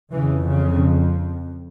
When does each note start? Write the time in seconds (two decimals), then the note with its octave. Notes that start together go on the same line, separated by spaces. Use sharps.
0.12 F2 C#3 E3
0.47 C#3